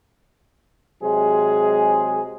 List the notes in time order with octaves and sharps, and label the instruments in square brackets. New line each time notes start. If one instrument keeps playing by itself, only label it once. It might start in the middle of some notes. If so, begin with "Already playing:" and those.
[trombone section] C3 F#3 G#3 G#4